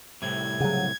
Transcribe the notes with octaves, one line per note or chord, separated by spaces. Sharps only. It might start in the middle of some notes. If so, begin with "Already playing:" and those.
C2 A2 C3 G#6
C#3 F#3 G#4 F#5